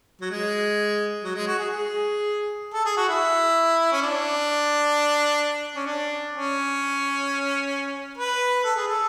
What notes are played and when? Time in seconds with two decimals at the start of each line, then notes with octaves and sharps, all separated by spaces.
0.21 F#3
0.31 G#3
1.24 F#3
1.36 G#3
1.47 F#4
1.59 G#4
1.71 G#4
2.74 A4
2.86 G#4
2.97 F#4
3.09 E4
3.92 C#4
4.02 D4
5.76 C#4
5.86 D4
6.33 C#4
8.18 B4
8.64 A4
8.76 G#4
8.88 A4